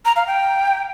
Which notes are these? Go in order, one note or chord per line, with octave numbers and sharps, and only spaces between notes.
A#5
F5
G5